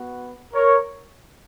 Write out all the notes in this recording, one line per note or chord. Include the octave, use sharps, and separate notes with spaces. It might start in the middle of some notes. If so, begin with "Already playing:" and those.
Already playing: B3 F#4
A#4 C#5